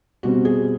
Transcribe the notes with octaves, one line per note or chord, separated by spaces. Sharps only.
B2 G3 C4 F#4
G#4